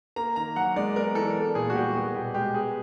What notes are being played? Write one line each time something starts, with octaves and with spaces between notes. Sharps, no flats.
A#3 A#5
D#3 A#5
F#3 F#5
G#3 D5
B3 A#4
E3 A4
B3
A#2 G#4
F#4
G3 G4
B3 G#4
B2 G4
G#3 G4
B3 G#4